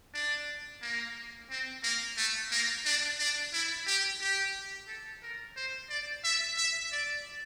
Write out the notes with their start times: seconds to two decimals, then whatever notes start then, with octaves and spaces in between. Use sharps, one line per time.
0.14 D4
0.82 A#3
1.50 C4
1.83 A#3
2.17 A3
2.51 A#3
2.85 D4
3.20 D4
3.53 E4
3.86 G4
4.21 G4
4.88 A4
5.23 A#4
5.56 C5
5.89 D5
6.24 E5
6.57 E5
6.92 D5